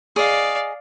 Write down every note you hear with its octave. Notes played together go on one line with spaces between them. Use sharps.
G#4 D5 D#5 F5